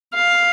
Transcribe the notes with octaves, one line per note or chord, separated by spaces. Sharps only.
F5